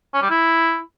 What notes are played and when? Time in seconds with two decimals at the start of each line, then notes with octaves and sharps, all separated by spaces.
0.14 C#4
0.22 G3
0.30 E4